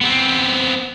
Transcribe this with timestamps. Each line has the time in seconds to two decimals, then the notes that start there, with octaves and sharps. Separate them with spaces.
0.01 B3 C4